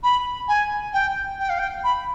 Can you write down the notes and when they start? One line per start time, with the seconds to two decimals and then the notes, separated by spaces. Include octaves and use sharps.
0.03 B5
0.48 G#5
0.93 G5
1.39 G5
1.49 F5
1.59 G5
1.84 B5